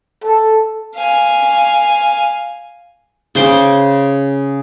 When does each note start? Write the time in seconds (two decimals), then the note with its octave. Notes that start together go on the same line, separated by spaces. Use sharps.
0.24 A4
0.96 F5 G#5
3.35 C#3 C5 C6 D6